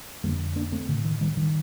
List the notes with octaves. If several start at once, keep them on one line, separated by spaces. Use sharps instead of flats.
F2 D3 G3 A#3
A#3 D4
A3 C4
A2 D3
D#3
D#3 G3
D#3 G3